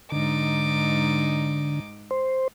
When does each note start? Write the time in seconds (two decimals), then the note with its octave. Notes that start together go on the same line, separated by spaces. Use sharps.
0.12 G#2 D3 D#4 D6
2.11 C5